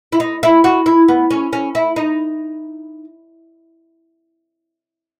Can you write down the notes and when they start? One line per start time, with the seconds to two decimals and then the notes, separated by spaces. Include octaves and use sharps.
0.12 E4
0.20 D#4
0.43 E4
0.64 F#4
0.86 E4
1.08 B3
1.30 C#4
1.53 C#4
1.75 E4
1.96 D#4